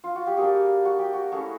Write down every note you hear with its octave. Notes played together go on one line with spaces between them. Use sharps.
F4
F#4
G4
G3 A#3 D4 F#4 G#4
F#4
G4
F#4
A3 C#4 E4 F#4 G#4